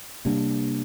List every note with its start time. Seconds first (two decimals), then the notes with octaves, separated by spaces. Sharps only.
0.25 C3 G3 A#3 D4